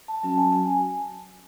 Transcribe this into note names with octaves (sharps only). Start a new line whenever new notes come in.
A5
F#3 C#4 F#4 A5
G#5
G#5